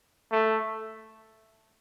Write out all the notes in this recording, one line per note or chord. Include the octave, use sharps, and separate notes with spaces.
A3